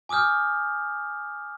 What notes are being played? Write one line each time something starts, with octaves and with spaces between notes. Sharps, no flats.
G#5 D6 D#6 F6 G6